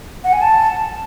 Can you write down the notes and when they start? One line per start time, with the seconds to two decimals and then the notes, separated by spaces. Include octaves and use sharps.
0.24 F#5
0.33 G#5
0.42 A5